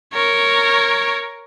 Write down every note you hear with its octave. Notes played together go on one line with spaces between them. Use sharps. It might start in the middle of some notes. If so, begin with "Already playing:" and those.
A#4 C#5